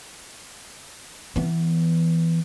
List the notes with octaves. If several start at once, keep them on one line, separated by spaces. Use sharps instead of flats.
E3 B3